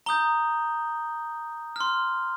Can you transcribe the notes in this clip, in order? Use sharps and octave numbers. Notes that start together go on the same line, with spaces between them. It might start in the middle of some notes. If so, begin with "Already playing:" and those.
A#5 D#6 G6 G7
C6 F6